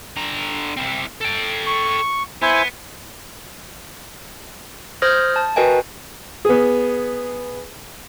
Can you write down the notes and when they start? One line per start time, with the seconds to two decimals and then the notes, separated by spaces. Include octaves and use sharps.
0.17 D3 A#5
0.77 C4 E4
1.21 A4 G5
1.67 C#6
2.42 B3 E4 C5 G#5
5.02 C5 D#6 F6 G6 G#6 A#6
5.36 A5
5.56 F#4 A#4 B4 D#5 G5 G#5
6.45 B3 G#4